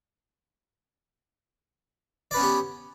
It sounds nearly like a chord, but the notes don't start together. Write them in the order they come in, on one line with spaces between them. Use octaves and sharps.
D5 B4 C#4 B3 G4